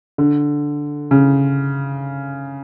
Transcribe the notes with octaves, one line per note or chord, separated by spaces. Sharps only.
D3
C#3